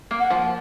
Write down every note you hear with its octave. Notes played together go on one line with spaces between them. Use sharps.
A#3
F#5
F3